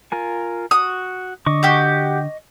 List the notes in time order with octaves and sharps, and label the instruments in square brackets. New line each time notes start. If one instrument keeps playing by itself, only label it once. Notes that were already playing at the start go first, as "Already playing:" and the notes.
[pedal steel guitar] F4 A#4 G#5
[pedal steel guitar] F#4 [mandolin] D#6
[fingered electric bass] D3 [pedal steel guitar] D#5 C#6 D6
[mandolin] F#4 G4